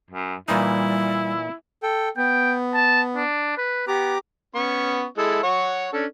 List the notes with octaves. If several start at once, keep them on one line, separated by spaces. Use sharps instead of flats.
F#2
A#2 E3 G3 D#4 E4
A4 G5
B3 G5
A5
D4
B4
B3 G4 A#5 D6
B3 C#4 C#6
G#3 E4 A4
C#5 F#5 C#6
C#4 D4 A4